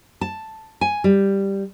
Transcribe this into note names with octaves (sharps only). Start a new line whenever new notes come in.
A5
G#5
G3